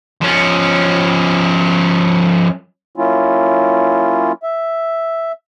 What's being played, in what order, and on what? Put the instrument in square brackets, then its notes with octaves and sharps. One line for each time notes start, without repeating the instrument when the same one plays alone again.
[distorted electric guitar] F3 C#4
[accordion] F#3 A#3 C#4 E4 F4
E5